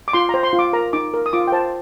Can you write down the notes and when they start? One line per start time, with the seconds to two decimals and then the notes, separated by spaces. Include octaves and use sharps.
0.08 D6
0.13 F4 C6
0.29 A#5
0.34 C5
0.43 C6
0.53 F4
0.59 D6
0.73 A#4 A#5
0.93 D#4 D6
1.14 A#4
1.26 D#6
1.33 F4 D6
1.47 G5
1.52 C5 A5